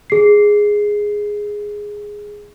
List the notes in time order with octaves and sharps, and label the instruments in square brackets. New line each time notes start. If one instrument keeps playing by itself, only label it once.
[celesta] G#4 C7